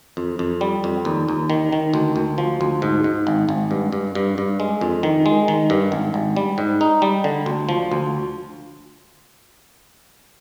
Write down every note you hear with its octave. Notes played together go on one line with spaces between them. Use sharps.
F2
F2
G3
F2
D#2
D#2
D#3
D#3
D2
D2
F3
D2
G#2
G#2
G#1
G#1
G2
G2
G2
G2
G#3
F2
D#3
G#3
D#3
G2
G#1
G#1
G3
G#2
D#4
G3
D3
D2
F3
D2